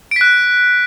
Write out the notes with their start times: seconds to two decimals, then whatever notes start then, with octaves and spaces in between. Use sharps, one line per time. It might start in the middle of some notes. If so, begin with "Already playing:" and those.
0.11 D7
0.16 B6
0.21 F#6